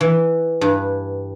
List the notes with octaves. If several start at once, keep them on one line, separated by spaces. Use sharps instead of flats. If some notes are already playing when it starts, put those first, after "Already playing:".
E3
G2